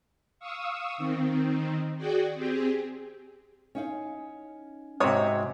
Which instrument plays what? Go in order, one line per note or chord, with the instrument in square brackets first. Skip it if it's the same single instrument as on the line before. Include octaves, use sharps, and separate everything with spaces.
[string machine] F5 C#6 D#6 E6
D#3 C4
F#4 G#4 D5 G5
C4 G4 G#4
[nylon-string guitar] C#4 D#4 F5
[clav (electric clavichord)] G#2 C3 [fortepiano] C4 C#5 D#6 [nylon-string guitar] F#4 G4